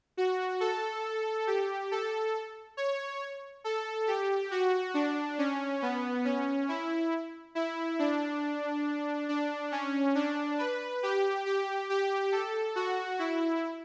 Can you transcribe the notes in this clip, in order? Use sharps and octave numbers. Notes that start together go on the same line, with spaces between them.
F#4
A4
G4
A4
C#5
A4
G4
F#4
D4
C#4
B3
C#4
E4
E4
D4
D4
C#4
D4
B4
G4
G4
G4
A4
F#4
E4